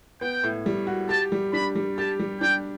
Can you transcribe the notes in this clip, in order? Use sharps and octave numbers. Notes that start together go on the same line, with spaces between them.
B3 G5
A2
G3
F#4
G4 A5
G3
D4 B5
G3
G4 A5
G3
D4 G5